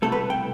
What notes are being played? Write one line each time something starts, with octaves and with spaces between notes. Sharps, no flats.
C2 B2 A3 A4
B4
G5